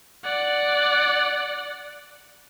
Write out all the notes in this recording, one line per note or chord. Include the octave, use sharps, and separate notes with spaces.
D5 F#5